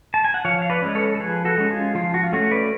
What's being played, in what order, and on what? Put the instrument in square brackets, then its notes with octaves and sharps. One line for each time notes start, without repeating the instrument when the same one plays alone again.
[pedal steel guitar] A5
G#5
F#5
F3 C#5 F5
F5
B4 D5
G#3 C#4
A4 C#5
A4
F3 G#4 B4
F#4 A4
G#3 C#4
F4 G#4
F3 F4
F#4
F4
A3 C#4 F#4
B4 D5